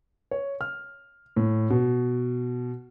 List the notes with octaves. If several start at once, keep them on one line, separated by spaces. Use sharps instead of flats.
C#5
F6
A2
B2